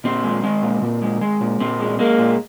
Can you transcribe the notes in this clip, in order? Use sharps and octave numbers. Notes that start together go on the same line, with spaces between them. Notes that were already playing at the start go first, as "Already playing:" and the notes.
A#2 C4
G#3
G#3
A#2
A#2
G#3
G#3
A#2
A#2 C4
G#3
G#3 A#3
A#2